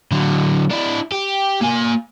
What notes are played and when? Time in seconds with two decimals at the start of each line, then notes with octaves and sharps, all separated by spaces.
0.11 D3 F#3
0.71 D4 E4
1.12 G4
1.62 A#3 G#5